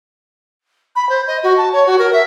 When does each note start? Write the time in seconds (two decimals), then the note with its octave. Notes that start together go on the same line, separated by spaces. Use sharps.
0.96 B5
1.09 C5
1.27 D#5
1.44 F#4
1.57 A5
1.73 C#5
1.86 F#4
1.99 A#4
2.13 E5